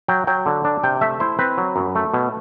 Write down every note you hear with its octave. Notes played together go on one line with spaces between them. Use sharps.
F#3 G5
F#3 G5
D3
D4
C3 G5
A3 E5
E4 C5
C4 B4
F#3
F#2
A3
B2